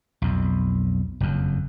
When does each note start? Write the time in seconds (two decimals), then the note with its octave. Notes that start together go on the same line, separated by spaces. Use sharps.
0.22 B1 F2
1.20 F#1 F2